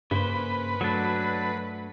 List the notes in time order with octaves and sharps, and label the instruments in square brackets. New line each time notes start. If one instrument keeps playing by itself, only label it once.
[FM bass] G2 [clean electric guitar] C#3 A#3 C5 [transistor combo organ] B4
[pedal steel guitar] F#3 D4 [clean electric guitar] A3